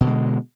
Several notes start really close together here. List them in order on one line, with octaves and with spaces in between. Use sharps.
B2 D3 G#3